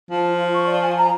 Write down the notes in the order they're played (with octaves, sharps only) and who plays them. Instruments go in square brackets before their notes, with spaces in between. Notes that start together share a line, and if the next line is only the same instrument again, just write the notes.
[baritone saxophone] F3
[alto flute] F4
C#6
D5
G#5
A#5